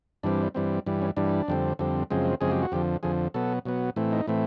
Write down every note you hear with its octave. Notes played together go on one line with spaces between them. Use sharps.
G2 E3 G3 C4 D4
G2 E3 G3 C4
G2 E3 G3
C#4
G2 E3 G3 D4
F2 D3 G3 C4
F2 D3 G3 C4
F#2 C#3 F3 G#3 C4
F#2 C#3 F3 G#3 C4 G#4
G4
F#4
F2 D3 F3 G4
F2 D3 F3 G#4
B2 F#3 B3 A4
B2 F#3 B3
A2 E3 A3 C4
D#4
A2 E3 A3 C4